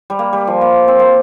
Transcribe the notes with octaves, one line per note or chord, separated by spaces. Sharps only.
G3
A#3
G3
F3
A#3
C4
A#3